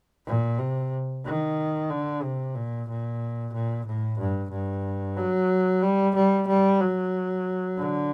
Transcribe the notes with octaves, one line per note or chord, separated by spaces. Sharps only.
A#2
C3
D#3
D3
C3
A#2
A#2
A#2
A2
G2
G2
F#3
G3
G3
G3
F#3
D3